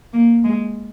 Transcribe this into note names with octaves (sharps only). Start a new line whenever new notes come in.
A#3
G#3